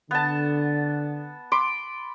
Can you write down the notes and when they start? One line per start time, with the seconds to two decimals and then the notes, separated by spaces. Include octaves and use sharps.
0.11 D3 B3 A5
1.52 B5 C6 D6